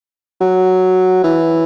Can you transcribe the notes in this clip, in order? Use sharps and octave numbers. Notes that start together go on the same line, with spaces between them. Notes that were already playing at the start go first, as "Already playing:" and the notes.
F#3
E3